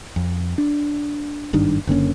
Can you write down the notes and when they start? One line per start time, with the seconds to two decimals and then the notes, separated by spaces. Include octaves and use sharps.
0.16 F2
0.58 D4
1.53 G#1 G2 D#3 D4
1.87 F#1 D3 A#3 C#4